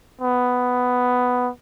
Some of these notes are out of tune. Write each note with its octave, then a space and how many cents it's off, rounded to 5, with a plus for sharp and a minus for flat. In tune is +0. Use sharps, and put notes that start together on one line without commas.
B3 +5